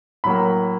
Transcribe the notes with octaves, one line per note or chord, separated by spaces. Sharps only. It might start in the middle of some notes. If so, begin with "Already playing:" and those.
A2 F#3 A#3 B5